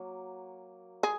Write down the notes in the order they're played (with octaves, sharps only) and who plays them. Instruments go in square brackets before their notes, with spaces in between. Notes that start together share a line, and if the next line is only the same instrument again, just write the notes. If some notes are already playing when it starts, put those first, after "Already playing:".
Already playing: [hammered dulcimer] F#3 A#3
[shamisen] G#4